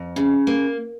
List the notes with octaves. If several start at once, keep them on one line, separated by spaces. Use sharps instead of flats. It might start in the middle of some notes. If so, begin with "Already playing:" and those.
Already playing: F2
C#3
A#3